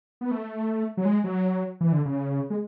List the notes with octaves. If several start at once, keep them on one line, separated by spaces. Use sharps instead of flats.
B3
A3
F#3
G#3
F#3
E3
D3
C#3
G#3